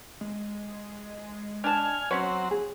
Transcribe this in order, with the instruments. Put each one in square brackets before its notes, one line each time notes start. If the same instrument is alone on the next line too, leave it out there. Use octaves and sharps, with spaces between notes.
[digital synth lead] G#3
[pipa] D4 A5 [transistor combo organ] G#5 F6
[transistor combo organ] F#3 C4 [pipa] C#4 C#5
[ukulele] G#4